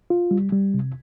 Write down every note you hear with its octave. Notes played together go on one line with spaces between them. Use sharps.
F4
G3
G3
C3